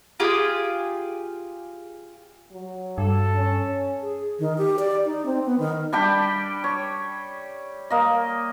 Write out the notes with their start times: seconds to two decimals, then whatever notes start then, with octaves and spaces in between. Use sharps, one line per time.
0.20 F4 G4 G#4
2.52 F#3
2.98 G2 A4
3.36 C#4
4.01 G#4
4.40 D#3
4.58 G4
4.79 D5
5.05 D#4
5.26 C4
5.45 B3
5.59 D#3
5.93 G3 D4 G4 G5
6.64 C#5
7.90 A#3 D#5